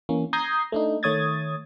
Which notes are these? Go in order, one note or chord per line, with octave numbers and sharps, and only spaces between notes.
E3 A#3 C#4
A#5 D#6 G6 G#6 A#6 C7
A3 D4 D#4
D#3 A3 C#5 D#6 G#6 A6